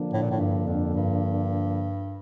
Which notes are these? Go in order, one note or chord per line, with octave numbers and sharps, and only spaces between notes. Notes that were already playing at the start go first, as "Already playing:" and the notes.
Already playing: D3 F3 A#3 D4
A2
A#2
A2
G2
F2
G2